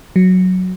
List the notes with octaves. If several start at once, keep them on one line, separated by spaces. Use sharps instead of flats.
F#3